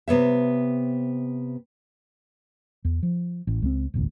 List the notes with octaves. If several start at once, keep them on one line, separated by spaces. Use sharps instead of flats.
C3 B3 C#5 E5
E2
F3
A1
C#2 F#3 C4
E1 A1 D2